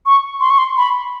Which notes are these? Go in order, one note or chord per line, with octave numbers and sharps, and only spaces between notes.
C#6
C6
C#6
C6
B5